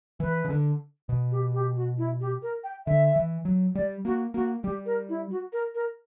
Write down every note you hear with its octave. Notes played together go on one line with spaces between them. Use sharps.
E3 B4
C#3
D3
B2
G4
G4
F#4
E4
G4
A#4
G5
D3 E5
E3
F#3
G3 D5
A#3 F#4
A#3 F#4
G3 G4
A#4
E4
F#4
A#4
A#4